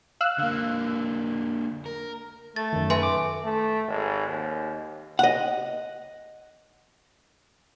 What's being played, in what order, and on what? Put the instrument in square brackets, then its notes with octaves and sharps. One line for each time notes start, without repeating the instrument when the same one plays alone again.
[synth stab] F5 E6 F#6
[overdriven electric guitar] D3 A#3
A#4
[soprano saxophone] A3 [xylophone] A6
[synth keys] F#2 D#3
[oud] B4 [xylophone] E5 G#5 C6
[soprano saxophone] D6
[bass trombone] A3
G#1
D#2
[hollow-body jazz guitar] D#5 F#5